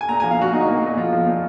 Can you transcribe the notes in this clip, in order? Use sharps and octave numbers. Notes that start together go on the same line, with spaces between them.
G#5
A#2 A#5
F3 G#5
F5
A#2 F#4
A#2 D#4
A#3
A#2
F3 F4
F3
A#2